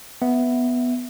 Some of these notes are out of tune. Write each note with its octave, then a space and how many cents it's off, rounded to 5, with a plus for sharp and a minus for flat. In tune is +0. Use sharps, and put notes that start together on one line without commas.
B3 +0 E5 +0